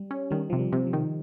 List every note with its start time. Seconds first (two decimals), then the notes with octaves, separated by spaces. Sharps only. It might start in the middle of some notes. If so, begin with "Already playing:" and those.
Already playing: G3
0.11 C#4
0.31 D#3 G3
0.50 C3 F3
0.59 G3
0.72 C3
0.87 F3
0.93 D#3